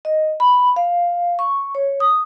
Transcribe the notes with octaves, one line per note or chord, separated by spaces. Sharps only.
D#5
B5
F5
C#6
C#5
D#6